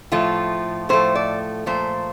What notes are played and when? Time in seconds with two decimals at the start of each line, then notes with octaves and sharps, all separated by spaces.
0.12 A2 F3 A3 F4
0.89 A2 F3 A3 C5
1.15 D5
1.66 A#2 F3 A3 C5